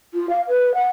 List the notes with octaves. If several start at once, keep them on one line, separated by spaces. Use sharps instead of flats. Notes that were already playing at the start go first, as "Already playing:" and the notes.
F4
F5
B4
F#5